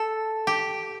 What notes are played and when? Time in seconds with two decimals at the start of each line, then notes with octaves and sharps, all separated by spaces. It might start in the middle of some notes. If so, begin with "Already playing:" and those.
Already playing: A4
0.47 G4